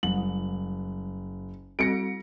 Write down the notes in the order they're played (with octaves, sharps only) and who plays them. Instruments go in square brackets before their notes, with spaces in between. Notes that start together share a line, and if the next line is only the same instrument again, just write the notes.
[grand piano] F#1 F#7 [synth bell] G3
[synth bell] G3 C4 F#4 [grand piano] A#6 C#7 D7